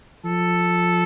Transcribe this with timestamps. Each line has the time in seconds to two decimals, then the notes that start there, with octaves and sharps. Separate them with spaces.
0.24 F3 A4